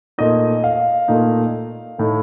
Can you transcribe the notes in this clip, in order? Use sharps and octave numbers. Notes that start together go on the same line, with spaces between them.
A#2 A3 D#4 D#5
F5
A#2 A3 D#4
A2 A3 D#4